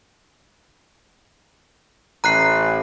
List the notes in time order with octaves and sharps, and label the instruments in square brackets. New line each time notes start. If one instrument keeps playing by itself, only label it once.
[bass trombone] A1 [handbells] A#5 F#6 C7